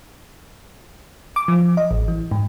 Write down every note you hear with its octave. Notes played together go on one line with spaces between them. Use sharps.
D6
F3
D#5
A1
E3
G#2